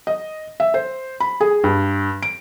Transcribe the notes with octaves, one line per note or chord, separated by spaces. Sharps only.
D#5
E5
C5
B5
G#4
G2
D7